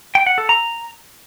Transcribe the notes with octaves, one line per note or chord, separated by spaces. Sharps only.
G5
F#5
A4
A#5